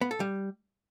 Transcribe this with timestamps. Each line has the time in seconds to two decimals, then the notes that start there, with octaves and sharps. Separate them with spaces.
0.01 B3
0.11 A4
0.20 G3